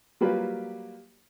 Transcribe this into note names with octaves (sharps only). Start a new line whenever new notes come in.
F#3 G3 A#3 F4 G4 B4